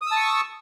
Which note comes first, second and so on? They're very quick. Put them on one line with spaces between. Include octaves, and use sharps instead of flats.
D#6 E6 A5 C#6